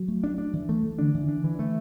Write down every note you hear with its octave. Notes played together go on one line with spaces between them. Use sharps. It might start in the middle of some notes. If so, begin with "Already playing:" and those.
Already playing: F#3
A3
D4
D4
E3
A3
E3
D3 D4
E3
D4
E3
A3